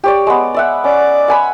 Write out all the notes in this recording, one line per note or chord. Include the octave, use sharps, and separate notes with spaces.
G4 C#5 D5
G#3 B3
D5 E5 F#5
C#4 D5
F#5 G#5 B5